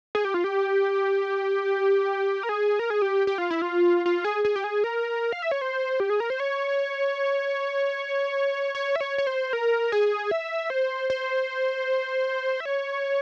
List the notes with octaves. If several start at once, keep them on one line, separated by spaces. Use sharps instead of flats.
G#4
G4
F4
G4
A#4
G#4
A#4
G#4
G4
G4
F4
E4
F4
F4
G#4
G#4
G4
G#4
A#4
F5
E5
C#5
C5
G4
G#4
A#4
C5
C#5
C#5
E5
C#5
C#5
C5
A#4
G#4
E5
C5
C5
E5
C#5